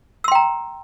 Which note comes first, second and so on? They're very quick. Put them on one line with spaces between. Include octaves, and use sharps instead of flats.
E6 C6 G5 A#5